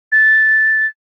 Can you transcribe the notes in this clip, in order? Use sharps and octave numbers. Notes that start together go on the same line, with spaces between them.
A6